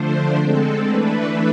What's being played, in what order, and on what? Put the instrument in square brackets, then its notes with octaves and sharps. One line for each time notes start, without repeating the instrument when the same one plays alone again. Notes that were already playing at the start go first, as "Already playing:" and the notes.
Already playing: [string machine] D3 F3 A3 D4 C5
D3 G#3 C4 A4
E3 A3 D4 B4